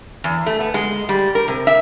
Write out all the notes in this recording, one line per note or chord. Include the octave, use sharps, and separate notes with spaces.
E2
A3
B3
G#3
G3
A#4
C3
E5